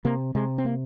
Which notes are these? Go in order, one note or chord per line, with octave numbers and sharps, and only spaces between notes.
C3 A#3
C3 G#3
C4
A#3